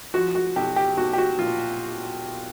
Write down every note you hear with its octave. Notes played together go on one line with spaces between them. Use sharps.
F3 F#4
F#4
B1 G4
G4
B1 F#4
G4
F#4
A#2 F4